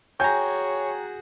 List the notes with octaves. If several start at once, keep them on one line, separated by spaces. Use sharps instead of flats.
F#4 G#4 C#5 G5 G#5 A#5 G6